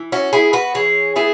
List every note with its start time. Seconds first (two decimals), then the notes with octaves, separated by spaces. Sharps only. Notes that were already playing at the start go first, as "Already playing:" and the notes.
Already playing: E3
0.12 C#4 F#4
0.33 B3 E4 G#4
0.53 F#4 B4
0.74 E3 G#4 C#5
1.16 B3 E4 G#4